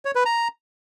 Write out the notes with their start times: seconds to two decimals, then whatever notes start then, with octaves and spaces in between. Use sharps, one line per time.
0.05 C#5
0.15 B4
0.25 A#5